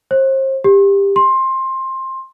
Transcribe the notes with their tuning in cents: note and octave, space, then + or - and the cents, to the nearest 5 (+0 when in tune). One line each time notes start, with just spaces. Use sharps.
C5 +35
G4 +20
C6 +15